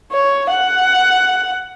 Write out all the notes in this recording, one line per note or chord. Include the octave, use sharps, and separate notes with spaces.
C#5
F#5